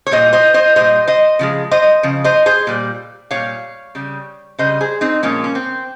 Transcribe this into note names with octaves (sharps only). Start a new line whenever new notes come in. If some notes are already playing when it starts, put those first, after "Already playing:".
C#5
A#2 G3 C5 D#5
C5 D#5
C5 D#5
A#2 G3 C5 D#5
C5 D#5
C#3 F3 G#3
C5 D#5
C#3 F3
C5 D#5
G#4 C5
A#2 G3
A#2 G3 C#5 F5
C#3 G3
C#3 G3 C5 D#5
G#4 C5
C4 D#4
A#2 F3 G#3 A#3 C#4
C#4
C4